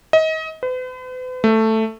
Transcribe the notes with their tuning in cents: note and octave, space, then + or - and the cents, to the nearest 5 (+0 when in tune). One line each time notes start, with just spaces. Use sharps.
D#5 +30
B4 +45
A3 +5